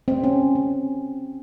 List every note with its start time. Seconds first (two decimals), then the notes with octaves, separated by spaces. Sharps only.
0.08 C4
0.24 C#4
0.55 C4